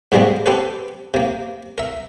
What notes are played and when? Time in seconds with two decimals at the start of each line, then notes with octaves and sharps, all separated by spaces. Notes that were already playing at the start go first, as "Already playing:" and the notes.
0.12 G#2 D3 G3 G#3 A#3 C4
0.46 C4 G4 A4 B4
1.14 C3 A#3
1.78 A#4 E5